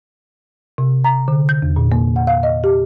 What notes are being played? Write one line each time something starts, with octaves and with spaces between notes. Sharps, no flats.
C3
A#5
D3
G6
E2
A#2
A#3
F#5
F5
D#5
G4